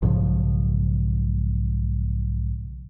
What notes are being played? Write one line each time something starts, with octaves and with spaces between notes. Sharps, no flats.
B1 G#2 C#3 F3